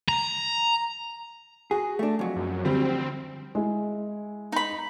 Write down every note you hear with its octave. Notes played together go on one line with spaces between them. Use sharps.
A#5
F#4 G#4
A3 D4
F2 F#3
F#2
D2 G3 C4
G#3 E4
D#4 B5